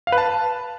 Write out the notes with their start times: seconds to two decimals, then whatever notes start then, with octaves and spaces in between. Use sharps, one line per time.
0.07 F5
0.12 B4
0.18 A5